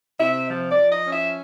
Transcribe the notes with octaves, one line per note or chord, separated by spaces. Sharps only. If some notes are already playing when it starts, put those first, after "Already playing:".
C3 E5
F3
D5
F3
D#5
C#4
E5